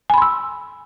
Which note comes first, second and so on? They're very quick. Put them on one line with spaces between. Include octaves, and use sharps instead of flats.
G#5 B5 C6 E6